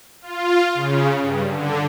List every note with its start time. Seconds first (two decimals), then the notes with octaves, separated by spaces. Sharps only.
0.22 F4
0.75 C#3
1.21 G2
1.50 D3